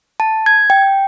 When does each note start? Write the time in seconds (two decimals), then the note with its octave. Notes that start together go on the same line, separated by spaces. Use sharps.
0.20 A5
0.46 G#6
0.70 G5